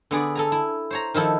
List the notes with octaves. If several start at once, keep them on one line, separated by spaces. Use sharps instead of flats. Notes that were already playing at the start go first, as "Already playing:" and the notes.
D3 B3 G#4 D5
A4 G#5 A#5
E4
C5 C#5 A#5
D#3 F3 E4 A4